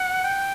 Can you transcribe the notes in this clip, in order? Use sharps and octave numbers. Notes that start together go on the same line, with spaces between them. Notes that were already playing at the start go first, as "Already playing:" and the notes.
Already playing: F#5
G5